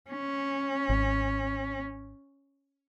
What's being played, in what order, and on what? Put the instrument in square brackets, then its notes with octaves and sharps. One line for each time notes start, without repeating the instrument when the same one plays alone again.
[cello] C#4
[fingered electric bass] G#1